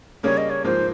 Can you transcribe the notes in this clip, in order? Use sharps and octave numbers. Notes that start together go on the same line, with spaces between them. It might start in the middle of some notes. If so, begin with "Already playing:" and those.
C#3 G3 A#3 C#4 C#5
D#5
C#5
G#2 F3 A#3 C5